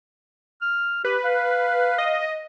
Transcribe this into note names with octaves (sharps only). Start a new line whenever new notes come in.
F6
G4 B4
F5
D#5